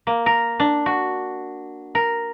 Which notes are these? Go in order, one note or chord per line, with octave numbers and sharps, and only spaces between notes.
A#3
A#4
D4
F#4
A#4